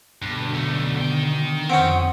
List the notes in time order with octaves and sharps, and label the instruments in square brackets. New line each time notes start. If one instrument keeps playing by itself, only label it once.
[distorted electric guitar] G2 [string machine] B2 D3
[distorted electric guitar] F#2 A3
D#3 G5
[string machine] F2 D#6 [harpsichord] C4 C#4 [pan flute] F#5